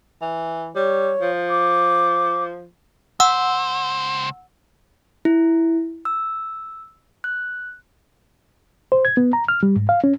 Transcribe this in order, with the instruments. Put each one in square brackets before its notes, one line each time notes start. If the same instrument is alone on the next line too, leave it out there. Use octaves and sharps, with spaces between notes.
[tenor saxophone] E3
[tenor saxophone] G3 [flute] C#5
[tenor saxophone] F3
[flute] D6
[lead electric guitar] C#2 C5 [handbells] F#5 E6
[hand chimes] E4
E6
F#6
[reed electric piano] C5
G#6
B3
A#5
F6
G3
G#2
F5
C#4